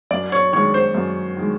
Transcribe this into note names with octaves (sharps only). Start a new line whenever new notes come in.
F#2 D5
C#5
D#3 G#3 C#5
C5
F#2
D#3 G#3